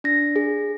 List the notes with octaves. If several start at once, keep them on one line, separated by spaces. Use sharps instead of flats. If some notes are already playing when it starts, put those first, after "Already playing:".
D4 A#6
G#4